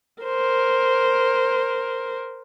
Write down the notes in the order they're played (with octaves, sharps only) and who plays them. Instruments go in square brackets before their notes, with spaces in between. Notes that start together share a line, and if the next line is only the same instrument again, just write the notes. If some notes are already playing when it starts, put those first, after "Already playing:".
[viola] A#4 C5